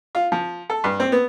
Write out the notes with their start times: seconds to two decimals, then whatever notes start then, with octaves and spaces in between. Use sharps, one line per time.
0.15 F4
0.32 F3
0.70 A4
0.84 G2
1.00 C4
1.12 B3